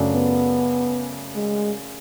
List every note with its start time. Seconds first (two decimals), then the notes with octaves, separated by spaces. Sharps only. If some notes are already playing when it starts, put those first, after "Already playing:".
Already playing: F#2 C#3 F#3 A3 D4
0.14 B3
1.36 G#3